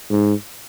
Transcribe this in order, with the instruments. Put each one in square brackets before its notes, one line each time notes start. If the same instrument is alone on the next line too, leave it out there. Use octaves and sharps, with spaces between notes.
[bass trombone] G#2